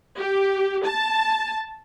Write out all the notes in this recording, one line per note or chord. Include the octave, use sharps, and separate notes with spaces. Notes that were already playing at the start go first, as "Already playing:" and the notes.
G4
A5